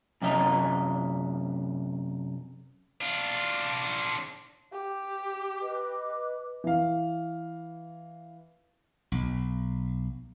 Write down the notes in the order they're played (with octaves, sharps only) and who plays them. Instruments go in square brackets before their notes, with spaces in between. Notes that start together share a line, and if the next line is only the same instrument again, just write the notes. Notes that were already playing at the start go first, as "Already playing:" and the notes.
[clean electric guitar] F#2 C3 C#4 D#5 E5 A#5
[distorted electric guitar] D4 F4
[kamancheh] G4
[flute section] B4 D#5 D6
[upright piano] E3 F5
[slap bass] B1